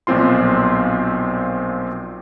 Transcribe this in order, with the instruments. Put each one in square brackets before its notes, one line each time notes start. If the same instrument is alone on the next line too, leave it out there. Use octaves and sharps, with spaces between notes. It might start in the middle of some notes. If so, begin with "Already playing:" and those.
[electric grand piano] B1 A#2 F3 C4 F4 C6